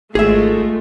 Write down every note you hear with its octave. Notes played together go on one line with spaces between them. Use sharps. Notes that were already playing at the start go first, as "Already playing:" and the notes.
G#1 G#3 A3 F4 G#4 E5